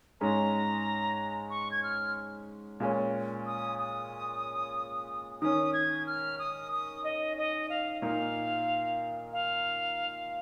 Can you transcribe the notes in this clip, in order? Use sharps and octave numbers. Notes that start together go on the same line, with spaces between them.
G#2 G#3 C#4 A#5
C#6
G#6
F6
A#2 G#3 C#4
D#6
D#6
D#3 C#4 D#6
G#6
F6
D#6
D#6
D#5
D#5
F5
A#2 A#3 D#4 F5
F5